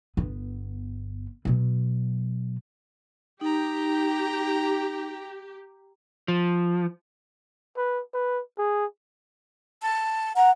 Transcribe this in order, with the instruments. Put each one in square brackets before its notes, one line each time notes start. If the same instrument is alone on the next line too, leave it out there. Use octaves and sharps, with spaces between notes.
[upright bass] G1 B3
B2 F#3
[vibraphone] D#4 [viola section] G4 [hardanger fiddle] G5 A#5
[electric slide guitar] F3
[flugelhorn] B4
B4
G#4
[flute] A5
[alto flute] F#5 [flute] A#5